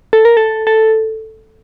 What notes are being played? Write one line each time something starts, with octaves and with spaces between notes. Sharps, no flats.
A4
A#4
A4
A4